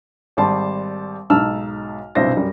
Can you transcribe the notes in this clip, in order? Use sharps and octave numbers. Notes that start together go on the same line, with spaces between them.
G#1 G3 A5 C6
B1 G#2 D#4 A5 E6 F6
B1 G2 C3 E4 C5 A#6
F#2 G3